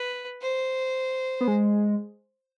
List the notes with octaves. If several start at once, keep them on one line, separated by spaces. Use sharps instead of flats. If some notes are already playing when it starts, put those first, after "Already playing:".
Already playing: B4
C5
B3
G#3